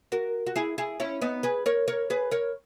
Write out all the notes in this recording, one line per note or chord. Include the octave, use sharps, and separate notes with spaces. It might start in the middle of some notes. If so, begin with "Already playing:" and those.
F#4 A#4
F#4
E4 G#4
E4 G#4
C#4 E4
B3 D#4
G#4 B4
A#4 C#5
A#4 C#5
G#4 B4
A#4 C#5